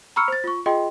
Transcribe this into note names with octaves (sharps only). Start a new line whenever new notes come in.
A#5 B5 C#6 E6 F6 C#7
C5 A6
F4 C#6
F4 G#4 D#5 G5 C6